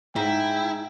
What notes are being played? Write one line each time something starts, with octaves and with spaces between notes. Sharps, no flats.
G#2 E4 G5